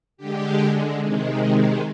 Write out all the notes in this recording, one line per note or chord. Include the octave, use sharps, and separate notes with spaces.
D3 G#3 G4
C3 D#3 G#3